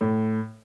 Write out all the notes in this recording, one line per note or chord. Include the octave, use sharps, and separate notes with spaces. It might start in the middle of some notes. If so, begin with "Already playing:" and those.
A2